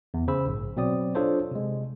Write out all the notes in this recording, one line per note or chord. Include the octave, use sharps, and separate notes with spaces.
E2
C#3 C5 B5 E6
A#1 G#2
B2 F#3 C4 D5 D#6
D4 F4 A4 C5 C#5
C3 G#3